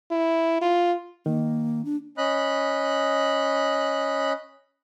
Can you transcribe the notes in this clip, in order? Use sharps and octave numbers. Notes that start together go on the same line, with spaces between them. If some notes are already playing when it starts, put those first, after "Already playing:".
E4
F4
D#3 A#3
D4
C#4 D#5 B5 F#6